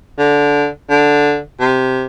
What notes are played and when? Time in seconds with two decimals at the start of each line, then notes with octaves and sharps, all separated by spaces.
0.19 D3
0.90 D3
1.60 C3